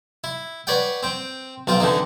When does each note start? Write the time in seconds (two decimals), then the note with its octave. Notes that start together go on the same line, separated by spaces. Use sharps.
0.24 E4
0.67 B4 C#5 D5 F#5 G5
1.03 C4 G5
1.67 B1 C4 F4 G5
1.80 D3 E3 C4 D#4